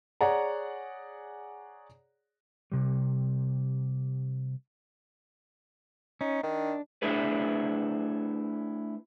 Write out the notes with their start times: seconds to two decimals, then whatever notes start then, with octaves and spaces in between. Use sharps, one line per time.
0.21 G#4 C#5 D5 F#5 A#5
2.72 C3 G3
6.21 C#4 D#4
6.43 D#3 D4
7.02 A3 D4 E4 G#4 B4